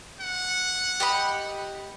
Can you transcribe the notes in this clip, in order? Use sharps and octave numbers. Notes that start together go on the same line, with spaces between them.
F#5
G4 D#5 B5